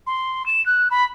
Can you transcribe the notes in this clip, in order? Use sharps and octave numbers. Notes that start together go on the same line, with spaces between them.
C6
E7
F#6
B5